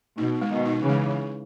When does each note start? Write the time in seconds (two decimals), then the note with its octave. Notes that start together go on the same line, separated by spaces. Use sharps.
0.18 B2 D#4
0.41 G#3
0.50 B2 D#3
0.65 D#4
0.81 C#3 E3
0.89 G#3